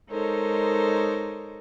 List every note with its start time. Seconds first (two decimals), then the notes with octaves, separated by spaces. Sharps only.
0.10 G#3 D#4 A4 A#4 C5 C#5